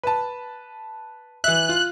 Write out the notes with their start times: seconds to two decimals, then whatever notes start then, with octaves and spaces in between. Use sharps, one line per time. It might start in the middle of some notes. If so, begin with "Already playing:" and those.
0.03 B4 A5
1.44 E3 E5 F#6
1.69 F4